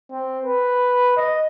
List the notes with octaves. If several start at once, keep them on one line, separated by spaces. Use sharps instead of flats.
C4
B4
D#5